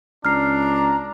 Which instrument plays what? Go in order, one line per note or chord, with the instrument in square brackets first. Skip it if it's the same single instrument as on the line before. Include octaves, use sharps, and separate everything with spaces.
[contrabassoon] C#2 [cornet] D4 [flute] A#5 [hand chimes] F6 C7